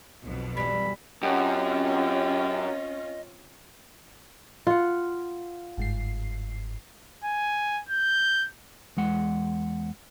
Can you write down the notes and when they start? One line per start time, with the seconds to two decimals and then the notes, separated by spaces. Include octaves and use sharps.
0.21 B1 F2 B2
0.57 E3 G3 B5
1.23 F#2 C4 C#4 F4 G4 D#5
4.67 F4 F#5
5.77 G1 G#2 C7
7.24 G#5
7.89 G6
8.97 E2 G#3 F#5